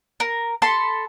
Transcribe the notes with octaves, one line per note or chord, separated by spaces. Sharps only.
A#4
A4 A5 B5 C6